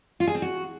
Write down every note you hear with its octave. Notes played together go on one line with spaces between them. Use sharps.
F4
G#4
C4
F#4